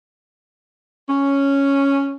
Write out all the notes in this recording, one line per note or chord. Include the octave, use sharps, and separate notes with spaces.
C#4